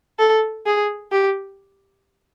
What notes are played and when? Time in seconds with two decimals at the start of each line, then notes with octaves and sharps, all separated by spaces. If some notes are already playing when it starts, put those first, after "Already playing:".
0.19 A4
0.66 G#4
1.11 G4